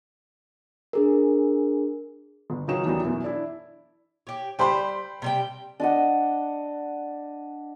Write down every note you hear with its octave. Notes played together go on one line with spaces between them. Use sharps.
D4 G#4 A#4
G1
C#2 D#3 F#3 C#4 D#4 E7
E2 E3 F#3 G3 D#4
F#2 B2 E3
D4 E4
G4 C#5
G3 C5 G5 B5 C6
C3 G3 G5
D4 D#5 F#5